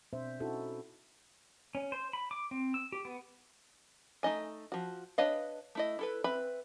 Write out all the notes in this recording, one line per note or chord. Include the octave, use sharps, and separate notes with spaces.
B2 C4 D4 C5 E5
C#4 D#4 E4 F#4 A4
C#4
C5
B5
D6
C4
E6
G4
B3
A3 D#4 D#5 G#5
F3 F#4
D4 B4 C#5 D#5 F5
A3 E4 D#5
E4 A4 B4
C4 B4 E5 B5